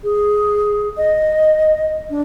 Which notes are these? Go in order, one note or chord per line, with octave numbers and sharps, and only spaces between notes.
G#4
D#5
D4